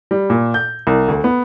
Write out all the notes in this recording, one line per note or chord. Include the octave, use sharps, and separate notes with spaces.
G3
A#2
G6
C2
D2
B3